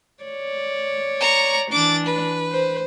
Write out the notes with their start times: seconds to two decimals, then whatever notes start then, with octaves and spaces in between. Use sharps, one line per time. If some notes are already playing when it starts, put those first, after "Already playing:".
0.24 C#5 D5
1.20 A#5 C#6
1.71 E3 D4 D6 A6
2.06 B4
2.51 C5